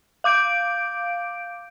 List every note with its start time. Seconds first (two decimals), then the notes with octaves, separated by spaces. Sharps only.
0.24 F5 D6 G6 D7